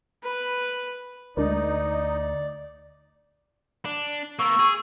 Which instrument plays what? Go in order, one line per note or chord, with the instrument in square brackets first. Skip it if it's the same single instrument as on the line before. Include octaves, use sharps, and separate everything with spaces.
[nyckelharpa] B4
[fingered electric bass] D2 [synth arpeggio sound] G#3 D4 A#4 [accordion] D#4 [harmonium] D5
[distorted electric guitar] D4
[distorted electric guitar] A#3 B3 [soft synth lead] C#6 [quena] E6
[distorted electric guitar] G#4